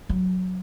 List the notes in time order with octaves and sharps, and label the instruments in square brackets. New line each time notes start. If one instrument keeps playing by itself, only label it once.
[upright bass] F#3